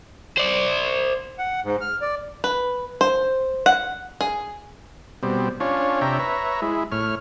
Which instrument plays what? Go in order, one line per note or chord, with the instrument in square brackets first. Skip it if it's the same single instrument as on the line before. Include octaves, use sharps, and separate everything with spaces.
[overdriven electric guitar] C5 D5
[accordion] F#5
G#2
F6
D5
[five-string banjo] B4
C5
F#5
G#4
[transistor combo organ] B2 G3 C4
C#4 D4 F4 C#5
C3 D4 C#5 E5 G5 A#5
B4 C#5 E5 A#5
G#3 E4
A2 C#5 F6